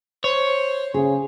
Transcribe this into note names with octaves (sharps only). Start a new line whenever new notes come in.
C5 C#5
C#3 G#4